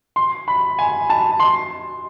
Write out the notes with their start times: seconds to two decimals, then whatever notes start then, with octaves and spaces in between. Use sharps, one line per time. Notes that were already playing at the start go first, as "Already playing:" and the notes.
0.16 C6
0.48 B5
0.79 G#5
1.10 A5
1.40 C6